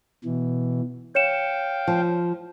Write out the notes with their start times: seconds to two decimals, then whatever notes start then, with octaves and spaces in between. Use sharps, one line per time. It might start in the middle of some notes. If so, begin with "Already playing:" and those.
0.25 B2 E3
1.15 C#5 F5 G5 C#7 E7
1.88 F3